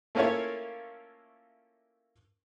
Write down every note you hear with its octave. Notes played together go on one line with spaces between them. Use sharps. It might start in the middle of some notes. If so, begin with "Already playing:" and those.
A3 A#3 C#4 E4 F4 C#5